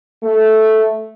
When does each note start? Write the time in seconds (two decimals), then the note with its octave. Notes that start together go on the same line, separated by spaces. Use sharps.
0.22 A3